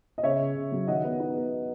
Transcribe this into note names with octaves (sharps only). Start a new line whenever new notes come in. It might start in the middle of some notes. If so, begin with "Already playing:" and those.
D#5
C#3 C#5 E5
C#3
C#3
F#3
D#3 D#5 F#5
B3
D#4
B3